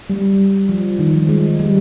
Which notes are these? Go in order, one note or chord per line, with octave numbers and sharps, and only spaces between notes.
G3
F3
D#3
F3
G#3
G3